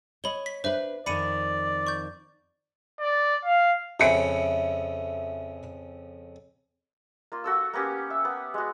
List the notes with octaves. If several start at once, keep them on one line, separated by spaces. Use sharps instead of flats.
C#5 D#5 B5 G7
B6
D4 B4 C5 E5
F2 D#3 D5 B5 C#7 D#7
C#6 G6
D5
F5
F2 C#3 E5 B5 C#7 D7
A#3 F4
F#4 A4 E6
A#3 B3 C#4 G4
E5
B3
G#3 F#4